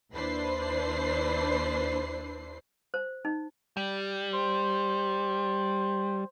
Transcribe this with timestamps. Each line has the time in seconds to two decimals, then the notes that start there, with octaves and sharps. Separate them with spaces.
0.13 D#2 D4 E4 B4 C5 C7
2.94 C5
3.25 D#4
3.77 G3
4.33 C5